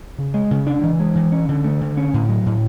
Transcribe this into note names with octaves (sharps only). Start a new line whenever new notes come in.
C#3
G#3
C#3
D4
E3
G#3
E3
C#4
D3
A3
D3
C#4
A2
F#3
A2